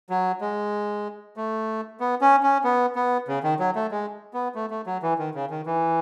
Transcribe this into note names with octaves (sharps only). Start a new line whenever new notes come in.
F#3
G#3
A3
B3
C#4
C#4
B3
B3
C#3
D#3
F#3
A3
G#3
B3
A3
A3
F#3
E3
D#3
C#3
D#3
E3